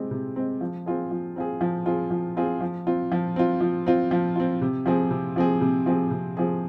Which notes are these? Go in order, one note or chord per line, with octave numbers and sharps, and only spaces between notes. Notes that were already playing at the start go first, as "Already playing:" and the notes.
Already playing: C3 G#3 C4
C3
G#3 C4
F3
C4 F4 G#4
F3
C4 F4 G#4
F3
C4 F4 G#4
F3
C4 F4 G#4
F3
C4 F4
F3
C4 F4
F3
C4 F4
F3
C4 F4
C3
F3 C4 G#4
C3
F3 C4 G#4
C3
F3 C4 G#4
C3
F3 C4 G#4